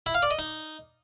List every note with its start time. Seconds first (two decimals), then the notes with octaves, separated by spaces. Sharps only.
0.06 E4
0.14 F5
0.23 D5
0.31 D#5
0.39 D#4